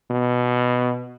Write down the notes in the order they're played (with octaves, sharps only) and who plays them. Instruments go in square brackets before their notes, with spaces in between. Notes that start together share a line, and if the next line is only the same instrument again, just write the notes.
[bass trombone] B2